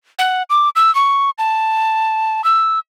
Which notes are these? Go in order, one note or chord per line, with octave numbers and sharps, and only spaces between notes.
F#5
D6
E6
C#6
A5
E6